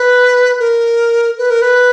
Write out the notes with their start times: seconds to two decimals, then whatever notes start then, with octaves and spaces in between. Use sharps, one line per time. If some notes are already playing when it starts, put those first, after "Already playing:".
Already playing: B4
0.60 A#4
1.38 B4
1.50 A#4
1.62 B4